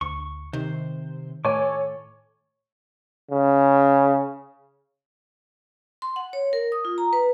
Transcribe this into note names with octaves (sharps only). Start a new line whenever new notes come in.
D2 C#6
C3 D#3 C5
A2 A4 C#5 G#5 D6
C#3
C6
F#5
C#5
A#4
D#6
F4
A#5
B4